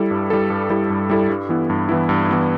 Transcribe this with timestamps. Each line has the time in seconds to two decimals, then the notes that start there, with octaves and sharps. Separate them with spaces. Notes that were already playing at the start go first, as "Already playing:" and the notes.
Already playing: G3 E4 A4
0.11 G2
0.30 G3 E4 A4
0.50 G2
0.70 G3 E4 A4
0.90 G2
1.10 G3 E4 A4
1.29 G2
1.49 E3 B3 E4
1.70 G2
1.89 E3 B3 E4
2.09 G2
2.29 E3 B3 E4